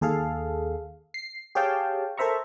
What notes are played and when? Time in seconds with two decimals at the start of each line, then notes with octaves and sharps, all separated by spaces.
0.01 D#2 G#4 A4 F5
1.14 C7
1.55 G4 G#4 C#5 F5 G5 A5
2.18 A4 A#4 C5 E5 A#5 C#6